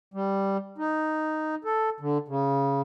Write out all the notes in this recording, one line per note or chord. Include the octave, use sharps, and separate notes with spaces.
G3
D#4
A4
D3
C#3